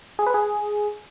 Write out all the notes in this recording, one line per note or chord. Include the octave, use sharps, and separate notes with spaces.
G#4
B4
G#4